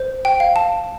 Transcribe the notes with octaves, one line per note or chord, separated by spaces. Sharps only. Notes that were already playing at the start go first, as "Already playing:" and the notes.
Already playing: C5
G5
F5
A5